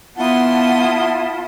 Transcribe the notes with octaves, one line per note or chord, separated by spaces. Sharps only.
B3 E4 F4 F#5 A5 C6 D#6